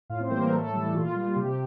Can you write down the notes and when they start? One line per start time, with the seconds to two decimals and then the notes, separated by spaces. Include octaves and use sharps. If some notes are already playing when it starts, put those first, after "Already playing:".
0.10 A2 F4 F5
0.20 C4 C5
0.30 E3 G3 A#3 A#4
0.41 A#3 A#4
0.52 A2 A3 A4
0.73 E3 G3
0.94 A#2 F4
1.16 G3
1.36 C3 G4